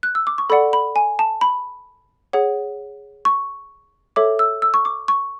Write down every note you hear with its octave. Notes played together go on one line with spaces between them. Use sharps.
F#6
E6
D6
C#6
A4 D5 F#5 B5
B5
G#5
A5
B5
G#4 C#5 F#5
C#6
A4 C#5 E5 D6
E6
E6
C#6
D6
C#6